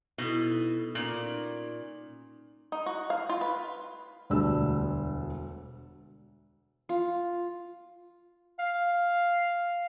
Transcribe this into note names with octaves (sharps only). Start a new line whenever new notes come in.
B2 D#4 E4 A4
A#2 C#4 D#4 D5
D#4
F#4
F5
F4
B4
E1 D2 G3 D4 E6
F4
F5